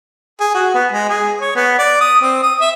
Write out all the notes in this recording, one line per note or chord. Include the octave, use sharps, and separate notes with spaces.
G#4
F#4
B3
G#3
G#4
C#5
B3
D5
D#6
C4
D#6
E5